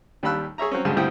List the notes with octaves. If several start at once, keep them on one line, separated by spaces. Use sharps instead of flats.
D#2 G3 A5 B5 E6 F#6
G#4 C#5 E5 A#5
F#3 C4 C#4
D2 G2 C#3 G#3 G#4 A5
D2 G2 C4 E4 G5 D#6